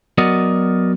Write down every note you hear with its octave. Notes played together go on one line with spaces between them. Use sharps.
F#3 B3 F#4 A#4 D5 D#5